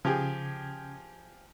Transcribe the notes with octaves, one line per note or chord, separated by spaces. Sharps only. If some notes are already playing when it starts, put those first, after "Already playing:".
C#3 F3 G4 G#4 G#6